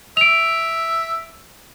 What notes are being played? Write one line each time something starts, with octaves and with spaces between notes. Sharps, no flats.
E5 D7 F7